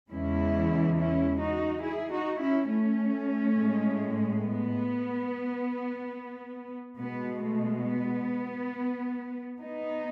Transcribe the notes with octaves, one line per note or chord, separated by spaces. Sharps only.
E2 C#3 E3 G#3 C#4 E4
C#4 E4
D#4 F#4
E4 G#4
D#4 F#4
C#4 E4
A3 C#4
A2 G#3
B3
B2 G#3 B3
A3
B3
B3 D#4